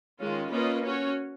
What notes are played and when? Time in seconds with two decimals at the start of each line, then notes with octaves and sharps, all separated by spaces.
0.21 D#3 G#3 C#4 F4
0.52 A#3 C#4 F4 B4 D#5
0.83 C#4 F#4 C#5